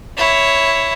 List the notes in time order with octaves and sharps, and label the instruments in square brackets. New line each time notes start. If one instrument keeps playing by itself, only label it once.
[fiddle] E4 C#5